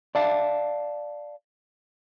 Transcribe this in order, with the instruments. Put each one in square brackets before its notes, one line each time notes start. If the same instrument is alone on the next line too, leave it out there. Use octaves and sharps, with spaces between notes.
[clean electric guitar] D5 E5 F5 A5